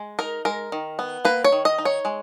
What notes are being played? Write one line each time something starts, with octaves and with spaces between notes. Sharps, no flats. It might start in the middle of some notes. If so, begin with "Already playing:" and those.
Already playing: G#3
D#4 A#4
G#3 A#4
D#3
B3
A#3 B4
C#5
D#3
D#5
D#4
C#5
G#3